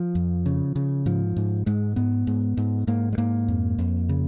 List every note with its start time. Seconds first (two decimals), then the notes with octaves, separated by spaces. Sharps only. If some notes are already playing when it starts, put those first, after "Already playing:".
Already playing: F3
0.15 F2
0.46 C#3
0.76 C#3
1.06 G#2 F3
1.36 G#2
1.66 G#2 G#3
1.96 G#2 B3
2.27 G#2
2.57 G#2
2.87 G#2 A#3
3.13 G#3
3.18 G#2 A#3
3.48 F2
3.78 F2
4.09 C#3